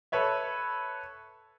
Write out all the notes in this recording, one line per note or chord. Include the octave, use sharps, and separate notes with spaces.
A4 B4 C#5 E5